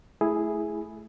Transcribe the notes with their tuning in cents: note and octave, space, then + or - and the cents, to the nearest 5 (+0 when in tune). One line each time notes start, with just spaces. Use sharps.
A3 -15 E4 +0 G#4 +0